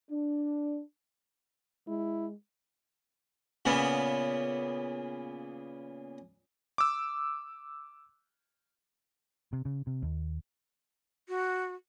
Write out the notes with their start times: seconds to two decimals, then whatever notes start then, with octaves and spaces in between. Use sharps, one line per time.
0.10 D4
1.88 G#3 E4
3.65 A#2 C#3 B3
6.78 D6 E6
9.53 C3
9.65 C#3
9.87 C3
10.02 D#2
11.29 F#4